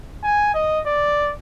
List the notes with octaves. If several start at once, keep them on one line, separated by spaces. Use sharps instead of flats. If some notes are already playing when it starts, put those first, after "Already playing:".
G#5
D#5
D5